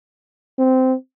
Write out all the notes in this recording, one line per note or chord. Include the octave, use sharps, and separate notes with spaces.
C4